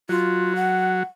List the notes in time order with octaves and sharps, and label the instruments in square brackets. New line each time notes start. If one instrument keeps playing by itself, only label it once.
[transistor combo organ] F#3 [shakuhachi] F4
[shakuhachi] F#5